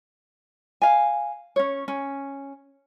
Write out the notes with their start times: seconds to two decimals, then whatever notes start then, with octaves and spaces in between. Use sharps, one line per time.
0.82 F5 G#5
1.56 C#4 C#5
1.88 C#4